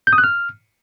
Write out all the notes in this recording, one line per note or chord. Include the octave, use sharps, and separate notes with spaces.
G6
D#6
F#6
F6